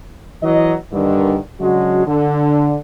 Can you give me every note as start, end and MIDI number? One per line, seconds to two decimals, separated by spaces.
0.43 0.74 52
0.43 0.74 54
0.43 0.74 75
0.93 1.36 43
0.93 1.36 46
0.93 1.36 50
0.93 1.36 51
1.60 2.06 49
1.60 2.06 54
1.60 2.06 56
1.60 2.06 62
1.60 2.06 66
2.06 2.76 50